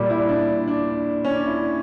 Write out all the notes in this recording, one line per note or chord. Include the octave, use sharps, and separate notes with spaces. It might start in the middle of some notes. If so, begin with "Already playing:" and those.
Already playing: A#2 G3
E4
D4
D4
C#4
D4
E4